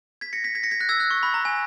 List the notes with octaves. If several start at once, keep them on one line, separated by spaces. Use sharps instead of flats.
G#6 B6
A#6 C#7
G#6 B6
G#6 B6
A#6 C#7
G#6 B6
F#6 A#6
E6 G#6
F#6
C#6
B5
A#5
G#5